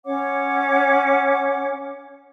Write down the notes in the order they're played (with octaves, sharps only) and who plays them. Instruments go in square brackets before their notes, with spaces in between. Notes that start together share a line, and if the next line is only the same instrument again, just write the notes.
[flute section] C#4 C#5 F#5 D6